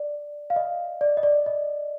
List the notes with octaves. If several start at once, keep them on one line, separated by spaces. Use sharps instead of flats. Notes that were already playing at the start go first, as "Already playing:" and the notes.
Already playing: D5
F5
D#5
D5
D#5
D5
D#5